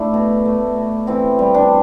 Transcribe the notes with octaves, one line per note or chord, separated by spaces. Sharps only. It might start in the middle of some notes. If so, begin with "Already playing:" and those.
Already playing: A3 D4 E4
B2
A3
B2
E3 C4
G3
D4